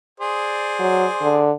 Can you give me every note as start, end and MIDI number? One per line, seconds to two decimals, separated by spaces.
0.20 1.48 68
0.20 1.48 72
0.20 1.48 74
0.80 1.05 54
1.22 1.52 50